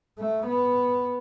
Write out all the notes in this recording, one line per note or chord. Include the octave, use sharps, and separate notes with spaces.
A3
B3